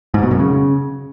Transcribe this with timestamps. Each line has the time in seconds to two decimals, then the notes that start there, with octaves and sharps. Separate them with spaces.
0.14 G#2
0.23 B2
0.31 F#2
0.39 C#3